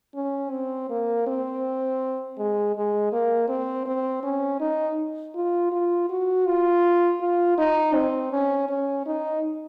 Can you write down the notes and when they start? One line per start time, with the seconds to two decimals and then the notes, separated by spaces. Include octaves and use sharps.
0.15 C#4
0.51 C4
0.90 A#3
1.27 C4
2.38 G#3
2.75 G#3
3.13 A#3
3.49 C4
3.86 C4
4.23 C#4
4.60 D#4
5.35 F4
5.72 F4
6.10 F#4
6.46 F4
7.21 F4
7.58 D#4
7.95 C4
8.32 C#4
8.69 C#4
9.06 D#4